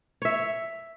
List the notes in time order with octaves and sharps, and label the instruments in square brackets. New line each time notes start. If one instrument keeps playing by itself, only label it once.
[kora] C#5 E5